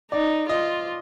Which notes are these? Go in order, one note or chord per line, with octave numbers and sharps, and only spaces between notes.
D#4 D5
F4 D#5